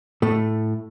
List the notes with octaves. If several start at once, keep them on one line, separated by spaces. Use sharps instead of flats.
A2 A3